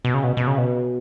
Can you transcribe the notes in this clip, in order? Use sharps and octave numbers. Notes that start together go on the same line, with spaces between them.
B2
C#3
B2
B2
C#3
B2